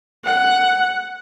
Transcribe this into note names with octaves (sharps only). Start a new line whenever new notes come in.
F#5